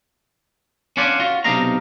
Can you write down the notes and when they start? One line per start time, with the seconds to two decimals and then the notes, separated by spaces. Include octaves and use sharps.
0.97 C#4 D4 F4 C#5 D5 F#5
1.20 C#4 F4 F#4
1.44 B1 C3 D4 D#4 F5 A#5